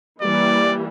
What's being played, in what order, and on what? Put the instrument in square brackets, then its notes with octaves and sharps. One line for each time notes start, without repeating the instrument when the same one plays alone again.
[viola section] E3 G3 A#3 [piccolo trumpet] D5